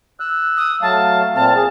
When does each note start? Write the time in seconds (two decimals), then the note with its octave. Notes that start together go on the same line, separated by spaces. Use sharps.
0.20 E6 F#6
0.57 D#6
0.82 F#3 A3 F5 A5
1.35 A#2 C4 A5 F6
1.55 G#4